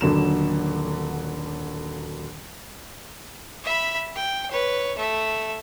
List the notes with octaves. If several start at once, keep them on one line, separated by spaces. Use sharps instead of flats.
D#1 D3 F#3 E7
E5 B5
G5
B4 C#5
A3 E5